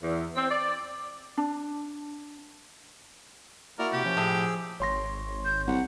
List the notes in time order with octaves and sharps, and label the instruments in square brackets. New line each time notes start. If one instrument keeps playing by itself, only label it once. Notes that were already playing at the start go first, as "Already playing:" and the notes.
[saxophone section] E2
C4
D5
[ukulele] D4
[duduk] A#3 [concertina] E4 F#4 D5 [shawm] A#4
[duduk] C3 [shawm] G4
[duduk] F3 [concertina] C#4
[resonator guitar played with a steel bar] A2 [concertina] G#4 E6
[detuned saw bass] G#1 [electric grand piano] C#5 C6 A#6
[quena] G6
[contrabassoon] C2 [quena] F#5